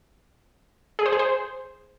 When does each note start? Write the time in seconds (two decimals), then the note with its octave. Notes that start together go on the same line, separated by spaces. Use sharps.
0.99 G#4
1.06 C5
1.12 G#4
1.19 C5